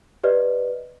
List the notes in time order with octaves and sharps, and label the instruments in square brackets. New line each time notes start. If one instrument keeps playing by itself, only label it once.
[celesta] G4 B4 D5 D#5 F6